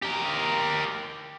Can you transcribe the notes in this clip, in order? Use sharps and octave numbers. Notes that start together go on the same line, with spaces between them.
G4 A#4